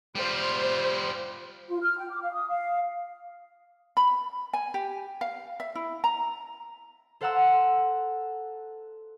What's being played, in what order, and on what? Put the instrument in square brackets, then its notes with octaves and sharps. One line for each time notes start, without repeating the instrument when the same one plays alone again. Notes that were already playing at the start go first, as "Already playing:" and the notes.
[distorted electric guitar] G3 F4 [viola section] C5
[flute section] F4
F6
G5
D6
F5
D#6
F5
[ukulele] B5
G#5
G4
F5
E5
E4
A#5
[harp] A4 C5 F5 F#5 A#5 E6